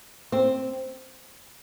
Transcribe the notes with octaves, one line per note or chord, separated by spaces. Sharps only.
C4